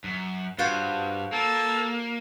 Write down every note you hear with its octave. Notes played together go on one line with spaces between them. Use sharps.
F#2
G2 F4 F#4 C5
A#3 A4